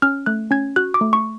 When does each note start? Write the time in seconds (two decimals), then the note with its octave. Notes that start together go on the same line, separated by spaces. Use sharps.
0.02 C#4 F6
0.26 A3 F#6
0.51 C#4 G#6
0.76 F#4 F#6
0.94 D6
1.01 A3
1.13 C#6